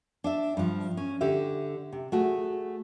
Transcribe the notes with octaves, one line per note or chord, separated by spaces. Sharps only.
D4 D5 E5
G2 F3
C#4
D3 G4 E5
C3
A3 F#4 G#4